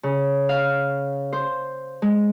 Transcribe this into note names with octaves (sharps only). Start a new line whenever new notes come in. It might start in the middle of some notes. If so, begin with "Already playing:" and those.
C#3
F5
C5
G#3